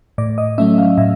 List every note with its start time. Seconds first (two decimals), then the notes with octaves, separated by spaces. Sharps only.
0.18 A2 D5
0.38 D#5
0.58 F#3 A3 C#4 E5
0.78 F5
0.98 A2 E5